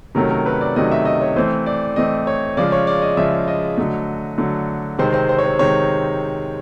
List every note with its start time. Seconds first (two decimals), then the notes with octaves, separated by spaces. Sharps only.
0.15 C3 D#3 F#3 A3 C#4 A#4
0.30 A#4
0.46 B4
0.61 D5
0.76 C3 D#3 F#3 A3 C#4 D#5
0.91 E5
1.05 D#5
1.21 C#5
1.36 E3 A3 C4 C5
1.66 D5
1.96 E3 A3 C4 D#5
2.27 C#5
2.57 C#3 F3 G#3 D5
2.72 C#5
2.87 D5
3.02 D#5
3.17 C#3 F3 G#3 E5
3.48 D#5
3.78 D3 F#3 A3
4.38 D3 F#3 A3
4.98 C3 D#3 G#3 C4 C5
5.14 C5
5.29 C5
5.38 C#5
5.44 C5
5.59 C3 D#3 G#3 C4 C#5